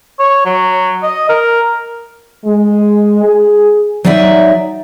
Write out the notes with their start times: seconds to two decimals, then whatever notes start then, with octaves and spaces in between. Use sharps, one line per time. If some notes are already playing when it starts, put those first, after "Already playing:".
0.19 C#5
0.45 F#3
1.03 D#5
1.29 A#4
2.46 G#3
3.24 G#4
4.05 F#3 D#4 D5 E5